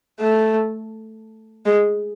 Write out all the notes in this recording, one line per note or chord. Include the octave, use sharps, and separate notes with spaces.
A3
G#3